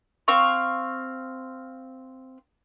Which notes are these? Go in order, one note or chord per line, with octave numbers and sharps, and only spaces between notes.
C4 F5 C#6